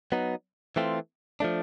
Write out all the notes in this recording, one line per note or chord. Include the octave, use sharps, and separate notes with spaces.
F#3 B3 D#4
E3 A3 C4 F4
F3 A3 D4